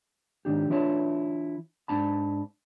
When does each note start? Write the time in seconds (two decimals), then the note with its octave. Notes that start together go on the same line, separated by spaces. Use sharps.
0.45 G#2 D#3 D4 G4
0.70 E3 D4 E4 F4 C#5 A5
1.88 G#2 D4 A5 B5